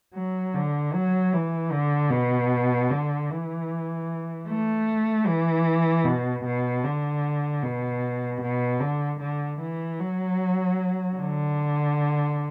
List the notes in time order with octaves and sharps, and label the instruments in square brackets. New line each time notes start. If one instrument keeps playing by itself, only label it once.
[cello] F#3
D3
F#3
E3
D3
B2
D3
E3
A3
E3
B2
B2
D3
B2
B2
D3
D3
E3
F#3
D3